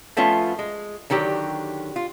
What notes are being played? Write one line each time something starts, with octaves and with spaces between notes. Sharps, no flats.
F3 A3 B3 C#4 F4
G#3
D3 D#3 F#3 G4
F4